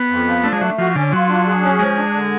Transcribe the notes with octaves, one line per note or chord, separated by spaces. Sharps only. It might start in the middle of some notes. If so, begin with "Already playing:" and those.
Already playing: B3
F2
F3
A3 D4
G#3
F#3 A3
F3 F#4
D3 C#4
F#3 F4
D4
G#4
C#4
F3 G#3
D4
D3